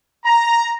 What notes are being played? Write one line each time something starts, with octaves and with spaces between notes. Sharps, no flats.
A#5